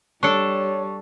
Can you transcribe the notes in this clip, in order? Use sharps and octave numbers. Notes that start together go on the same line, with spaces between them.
G3 D4 A4 C#5 C#6